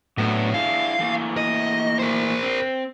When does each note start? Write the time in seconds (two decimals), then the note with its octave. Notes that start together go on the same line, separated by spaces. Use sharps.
0.18 A2 F#3 B3 D4
0.54 D4 E4 G#4 F5
0.99 E3 A3 A#3
1.37 D#5
1.99 A#4 C5
2.43 C4